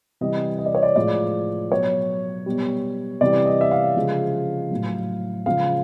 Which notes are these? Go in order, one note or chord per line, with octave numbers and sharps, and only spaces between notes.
C3 E3 G3 D#5
D#5
D5
C#5
D5
A2 F3 G#3 D5
B2 F#3 C#5
B2 G3
C3 E3 G3 D5
D#5
E5
F5
C#3 F3 G#3
A2 F#3
C#3 F3 G#3 F5